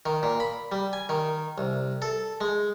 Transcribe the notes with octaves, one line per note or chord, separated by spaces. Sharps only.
D#3
A#2
B5
G3
G#5
D#3
C2
A4
G#3